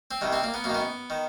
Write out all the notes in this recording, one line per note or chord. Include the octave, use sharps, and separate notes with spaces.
C4
C2 C3 D#3
C4
A#3
B3
F#2 D#3 A#3
B3
D#3